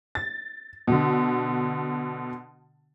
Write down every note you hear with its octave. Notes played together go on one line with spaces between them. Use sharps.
A6
B2 D3